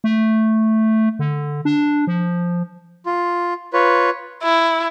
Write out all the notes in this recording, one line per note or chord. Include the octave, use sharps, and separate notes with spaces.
A3
D3
D4
F3
F4
F4 B4 C#5
E4